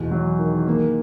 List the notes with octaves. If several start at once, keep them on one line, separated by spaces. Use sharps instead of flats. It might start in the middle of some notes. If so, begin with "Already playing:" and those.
Already playing: E2 B2
F#3
D#3
A#3